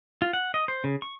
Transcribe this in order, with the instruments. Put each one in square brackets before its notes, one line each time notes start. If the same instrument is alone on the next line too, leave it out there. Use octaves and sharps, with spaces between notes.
[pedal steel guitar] F4
F#5
D#5
C5
C#3
C#6